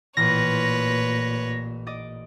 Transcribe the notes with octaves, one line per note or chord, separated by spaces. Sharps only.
A1 A#2 B4 C#5 C6 F6 A#6
D5 D#5 D6